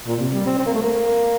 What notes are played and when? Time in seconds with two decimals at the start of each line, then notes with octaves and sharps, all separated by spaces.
0.08 A#2
0.20 C3
0.34 G3
0.46 C4
0.59 C4
0.66 A#3
0.75 A3
0.82 A#3